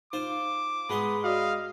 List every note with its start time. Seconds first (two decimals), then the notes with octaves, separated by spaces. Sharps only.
0.13 D#4 F4 C5 D6
0.89 G#2 G#3 B3 D#4 C6
1.24 F#4 D5 D#5 F5